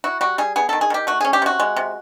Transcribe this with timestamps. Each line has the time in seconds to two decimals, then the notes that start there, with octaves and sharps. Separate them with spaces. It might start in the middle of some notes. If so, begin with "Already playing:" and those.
0.04 E4 F#4
0.21 G3 F#4
0.38 G3 G#4
0.56 B3 G#4
0.69 D#3 A4
0.81 G#4
0.90 D#3 G4
1.07 A3 F#4
1.21 C#4 G#4
1.33 G4
1.42 C3 F#4
1.60 G#3
1.76 C3